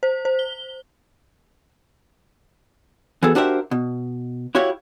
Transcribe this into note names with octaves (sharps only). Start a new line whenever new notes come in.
C5
C5
G7
E3 B3 F#4 G#4 A4
D4 F#4 G4 A#4 C5 E5
B2
E4 F#4 G4 C#5 E5 F5